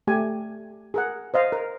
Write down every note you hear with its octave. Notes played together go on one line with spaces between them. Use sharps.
A3 G4 G#5
G#4 A#4 F#5
C5 D#5 F5
A#4